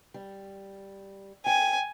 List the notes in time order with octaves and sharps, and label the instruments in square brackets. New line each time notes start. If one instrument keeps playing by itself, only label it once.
[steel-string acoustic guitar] G3
[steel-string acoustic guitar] G5 [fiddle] G#5